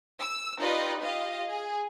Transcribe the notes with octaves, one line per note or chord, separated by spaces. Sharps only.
E6
D#4 F4 G4 B4 D5 D#5
F4 G4 D#5 F5
G#4